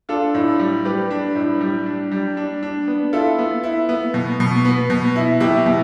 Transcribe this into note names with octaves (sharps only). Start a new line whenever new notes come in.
D4 F4 A4
A2
G3
G3 G4 B4
D4
A2
G3
D4
G3
D4
D4
B3
E4 F4 A4
B3
E4
B3
B2
B2
B3
B2
E4
B2 E4 G4
B2